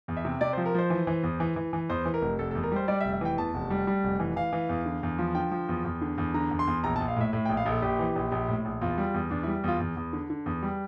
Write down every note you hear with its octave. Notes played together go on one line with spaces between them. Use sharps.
E2
E5
C3
C3 D5
C5
F3
A#4
F3 C5
E3
E3
E2
E3
E3
E3
E2 C5
E3
A#4
F1
F1 A4
A4
E2
A#4
G3 C5
G3 D5
E5
F1
E5
E3 G5
E2 A5
F1
G3
G3
F1
E3
E3 F5
E3
E2
D3
E2
F3
D3 G5
F3
E2
E2
D3
E2
D3 A#5
E2
C6
E2
A#1 A#5
A5
A#1
F5
A2 E5
A2 E5
G5
A#1
F5
A#1 A4
A#1 G4
E3
A#1
A#1
A2
A#1
E2 F4
G3
E2
E2 D4
E4
G3
E2 F4
E2
E2
D3
D3
E2
G3